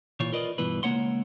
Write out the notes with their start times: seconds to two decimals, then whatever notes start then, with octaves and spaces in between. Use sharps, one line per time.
0.20 A#2 E3 F4 C#5
0.33 F4 A#4 B4 D5 D#5
0.58 G2 B2 E3 B4
0.83 C#2 E3 A#3 C#5 F#5 C6